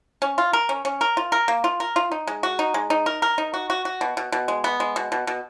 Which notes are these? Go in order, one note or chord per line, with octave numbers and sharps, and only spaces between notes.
C#4
F4
A#4
C#4
C#4
A#4
F4
A#4
A#3
F4
A#4
F4
D#4
G#3
F#4
D#4
G#3
D#4
A#4
A#4
D#4
F#4
F#4
F#4
B2
B2
B2
G#3
B3
G#3
B2
B2
B2